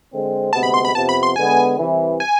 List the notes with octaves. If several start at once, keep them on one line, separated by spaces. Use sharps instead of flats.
D3 G#3 C4
D2 C3 G#3 B3 A5
B5
C6
B5
F2 C3 F3 B3 A5
B5
C6
D3 G#3 B3 G#5
C2 C3 E3
G#5